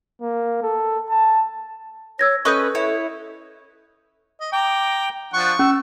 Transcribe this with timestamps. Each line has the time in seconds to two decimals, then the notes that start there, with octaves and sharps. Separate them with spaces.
0.22 A#3
0.63 A4
1.10 A5
2.19 C#5 E6 G#6 A#6
2.45 C#4 A4 B4 D#5 C#6 D#6 G6
2.75 E4 C#5
4.41 D#5
4.53 G5 A#5 D6
5.34 F3 D4 F#5 C#6
5.59 C#4 E6